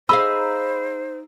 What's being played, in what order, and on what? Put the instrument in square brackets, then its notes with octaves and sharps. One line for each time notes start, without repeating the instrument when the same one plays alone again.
[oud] D#4 G#4 F5 [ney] C5 [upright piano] B5 [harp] E6